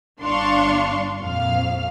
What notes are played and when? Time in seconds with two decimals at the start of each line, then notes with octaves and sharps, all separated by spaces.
0.21 G1 D4 F5 C6 C#6
1.20 A#1 F2 F5 F6